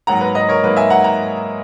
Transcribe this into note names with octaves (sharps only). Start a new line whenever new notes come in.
G#2 F#3 A#3 F#5 A#5
B4
B4 D#5
A#4 C#5
G#2 F#3 A#3 B4
E5 G#5
F#5 A#5
F#5 A#5